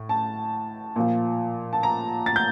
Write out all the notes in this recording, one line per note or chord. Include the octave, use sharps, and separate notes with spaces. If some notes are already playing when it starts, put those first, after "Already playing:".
Already playing: A2
A5
A#2 F3
A5
A#5
A6
G6